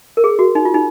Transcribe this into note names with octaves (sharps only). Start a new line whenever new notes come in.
A#4
G#4
F#4
D#4
F4
D#4